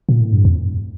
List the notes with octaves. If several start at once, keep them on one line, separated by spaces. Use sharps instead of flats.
A#2
A2
G2
F2